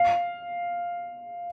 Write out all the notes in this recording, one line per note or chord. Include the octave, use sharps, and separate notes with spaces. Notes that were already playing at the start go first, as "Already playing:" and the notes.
Already playing: F5